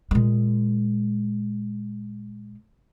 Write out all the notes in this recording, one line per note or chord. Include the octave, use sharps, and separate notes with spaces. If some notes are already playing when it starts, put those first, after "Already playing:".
A#2 G#3